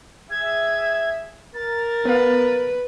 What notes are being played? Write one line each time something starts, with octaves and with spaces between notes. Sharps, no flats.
G#4 E5 G#6
A#4 A6
B3 B4 F5